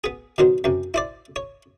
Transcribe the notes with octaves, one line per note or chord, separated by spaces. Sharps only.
B3 G#4
B2 D#3 F#3 C5
F#2 C3
E4 C5 D5
C#5